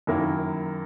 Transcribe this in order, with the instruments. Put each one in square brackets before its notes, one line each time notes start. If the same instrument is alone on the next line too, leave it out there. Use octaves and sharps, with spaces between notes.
[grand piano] F#2 D#3 A#3 E4 A#4